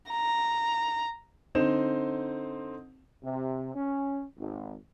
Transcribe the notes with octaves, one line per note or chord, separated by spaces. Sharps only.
A#5
D3 C4 D#4 C5 E7
C3
C#4
G#1